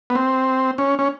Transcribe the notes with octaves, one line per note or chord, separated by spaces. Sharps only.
B3
C4
C#4
C#4